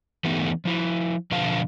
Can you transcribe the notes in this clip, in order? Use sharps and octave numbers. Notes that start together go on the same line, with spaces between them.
E3 A3 B3 D#4 G4
F3 E4
B2 D3 F3 B4 F5 A5